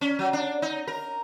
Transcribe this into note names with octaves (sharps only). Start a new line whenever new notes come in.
C#4
F#3
D4
D#4
A#4